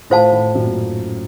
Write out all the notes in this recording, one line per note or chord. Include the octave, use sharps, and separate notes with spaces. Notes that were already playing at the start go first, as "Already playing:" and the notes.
A2 F4 C5 F5 A5
A2
F#2 A#2